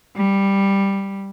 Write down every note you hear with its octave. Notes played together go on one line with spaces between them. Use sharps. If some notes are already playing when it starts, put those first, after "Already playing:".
G3